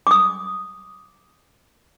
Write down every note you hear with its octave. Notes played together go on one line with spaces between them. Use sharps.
D6 D#6